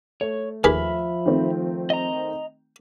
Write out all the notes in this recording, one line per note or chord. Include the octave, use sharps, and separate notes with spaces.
A3 C#5
D#2 F3 G#4 B4 E5 B5 F6
D#3 A3 C4
D#5 A#5